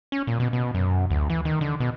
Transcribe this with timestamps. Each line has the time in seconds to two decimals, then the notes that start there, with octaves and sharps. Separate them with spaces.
0.12 C#4
0.27 A#2
0.40 B2
0.53 B2
0.75 F#2
1.11 D2
1.30 E3
1.45 D#3
1.61 D3
1.80 B2